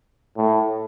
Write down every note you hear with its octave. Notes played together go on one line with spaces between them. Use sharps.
A2